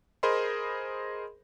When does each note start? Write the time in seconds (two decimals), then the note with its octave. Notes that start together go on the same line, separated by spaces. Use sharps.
0.23 G#4 A#4 C5 D#5 B5 C6